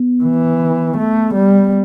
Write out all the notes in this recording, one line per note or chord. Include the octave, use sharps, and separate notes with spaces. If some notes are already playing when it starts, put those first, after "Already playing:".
Already playing: B3
E3
A3
G3